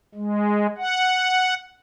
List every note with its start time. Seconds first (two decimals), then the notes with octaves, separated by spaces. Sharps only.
0.15 G#3
0.78 F#5